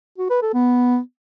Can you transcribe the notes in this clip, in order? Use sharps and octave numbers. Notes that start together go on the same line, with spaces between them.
F#4
B4
A4
B3